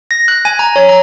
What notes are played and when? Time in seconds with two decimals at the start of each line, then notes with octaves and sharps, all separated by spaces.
0.11 A#6
0.28 F#6
0.45 G#5
0.59 A#5
0.76 C#5
0.89 A#5